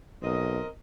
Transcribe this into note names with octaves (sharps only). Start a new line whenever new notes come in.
B1 C4 A#4 D#5